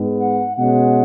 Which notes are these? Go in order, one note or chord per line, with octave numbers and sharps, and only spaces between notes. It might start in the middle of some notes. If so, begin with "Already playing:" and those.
Already playing: G#2 G#3 B3
F#5
B2 G#3 C#4 F#5